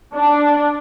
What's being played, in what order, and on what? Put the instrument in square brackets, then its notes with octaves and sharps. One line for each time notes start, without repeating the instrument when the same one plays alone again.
[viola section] D4